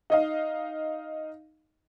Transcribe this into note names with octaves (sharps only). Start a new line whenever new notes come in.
D#4 D#5 F5